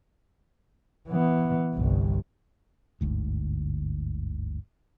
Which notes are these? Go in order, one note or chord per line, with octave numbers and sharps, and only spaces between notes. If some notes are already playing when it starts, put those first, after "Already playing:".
E3 B3
G1 C2
G1 D2 G#2